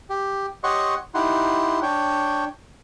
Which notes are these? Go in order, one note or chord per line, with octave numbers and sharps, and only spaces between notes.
G4
G4 C#5 D#5 F#5 C6 C#6
D#4 E4 G4 F#5 C6
D4 C#5 G5